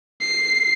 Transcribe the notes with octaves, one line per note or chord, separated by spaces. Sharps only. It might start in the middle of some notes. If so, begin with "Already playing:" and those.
C7